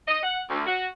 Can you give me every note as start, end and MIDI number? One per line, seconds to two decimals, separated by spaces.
0.08 0.19 75
0.23 0.41 78
0.50 0.64 38
0.66 0.86 66